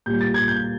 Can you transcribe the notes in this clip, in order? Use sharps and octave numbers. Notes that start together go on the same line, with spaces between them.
A#2 G3 G6
A6
G#6
G6